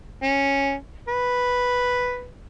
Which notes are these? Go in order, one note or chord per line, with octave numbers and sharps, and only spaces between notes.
C#4
B4